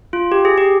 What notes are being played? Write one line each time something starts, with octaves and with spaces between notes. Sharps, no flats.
F4
G4
G#4
G4